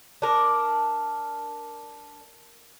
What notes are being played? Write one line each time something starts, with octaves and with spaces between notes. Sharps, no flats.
D4 A#4